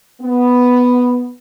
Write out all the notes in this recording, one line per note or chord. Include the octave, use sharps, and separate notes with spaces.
B3